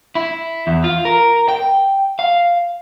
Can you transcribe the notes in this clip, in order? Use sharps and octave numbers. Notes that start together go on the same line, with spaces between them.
E4
E2
F4
A#4
G5
F5